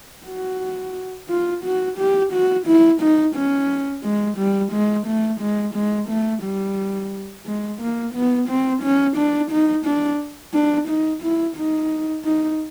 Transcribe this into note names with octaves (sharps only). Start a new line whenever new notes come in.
F#4
F4
F#4
G4
F#4
E4
D#4
C#4
G#3
G3
G#3
A3
G#3
G#3
A3
G3
G#3
A#3
B3
C4
C#4
D4
D#4
D4
D4
D#4
E4
D#4
D#4